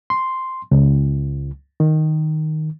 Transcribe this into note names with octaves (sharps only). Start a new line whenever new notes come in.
C6
C#2
D#3